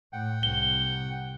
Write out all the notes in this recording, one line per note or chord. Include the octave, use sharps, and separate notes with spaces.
A2 F#5 G5
C2 G7